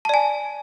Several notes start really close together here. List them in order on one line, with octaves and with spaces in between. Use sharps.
A5 D5 G#5